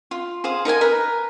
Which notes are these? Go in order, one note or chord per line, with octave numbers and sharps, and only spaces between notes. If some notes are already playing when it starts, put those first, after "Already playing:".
F4
G#4 C5 F5 D#6
D#4 A#4 D#5 G#5
A#4 B4